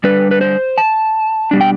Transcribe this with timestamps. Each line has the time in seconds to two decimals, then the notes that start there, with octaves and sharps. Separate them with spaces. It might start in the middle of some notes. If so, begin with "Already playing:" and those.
0.04 D3 G3 D4 B4
0.31 B4
0.41 C5
0.78 A5
1.51 B2 G3 D4
1.61 G5